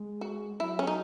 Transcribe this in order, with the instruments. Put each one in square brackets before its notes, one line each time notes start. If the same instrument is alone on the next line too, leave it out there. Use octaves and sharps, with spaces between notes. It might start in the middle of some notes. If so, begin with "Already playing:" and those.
Already playing: [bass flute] G#3
[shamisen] F#4
[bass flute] F#3 [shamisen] E4
[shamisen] C#4
D#4